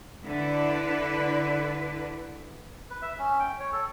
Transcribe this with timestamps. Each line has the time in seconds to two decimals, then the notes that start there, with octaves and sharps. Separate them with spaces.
0.24 D3 D4 E4 B4 D5
2.90 B4
3.02 E5
3.19 C#4
3.40 G5
3.60 C#5
3.73 A4